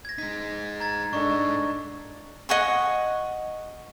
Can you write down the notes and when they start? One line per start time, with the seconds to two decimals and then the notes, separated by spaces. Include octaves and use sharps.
0.05 G#6 A#6
0.18 G#3 D#4 B6
0.80 A#5 G#6 A6
1.13 G#2 D4 D#4 A4 C#6
2.49 D#5 F#5 G#5 C#6